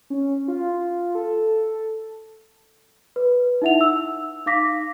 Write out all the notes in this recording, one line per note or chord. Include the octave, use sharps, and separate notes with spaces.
C#4
F4
A4
B4
D#4 E4 E5 F#5 F7
E6
D#4 F5 D6 A#6 B6